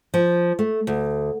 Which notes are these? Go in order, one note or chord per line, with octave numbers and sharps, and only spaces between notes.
F3
A3
D2